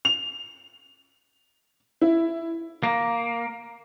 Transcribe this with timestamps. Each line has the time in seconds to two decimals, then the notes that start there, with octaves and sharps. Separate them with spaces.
0.05 F7
2.02 E4
2.83 A#3